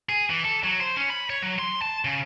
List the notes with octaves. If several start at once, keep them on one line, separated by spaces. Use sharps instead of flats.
G#4
E3
A4
F#3
C5
C#4
B5
C#5
F#3
C6
A5
C#3